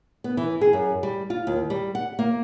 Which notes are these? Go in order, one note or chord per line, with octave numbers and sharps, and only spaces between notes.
B3
E3
G#4
F#2
G3
F4
D#2
G3
F#5
A#3